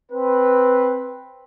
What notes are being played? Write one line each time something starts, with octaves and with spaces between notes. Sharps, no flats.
C4 B4